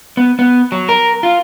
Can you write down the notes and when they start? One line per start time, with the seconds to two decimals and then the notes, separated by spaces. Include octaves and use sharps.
0.17 B3
0.39 B3
0.72 F#3
0.89 A#4
1.23 F4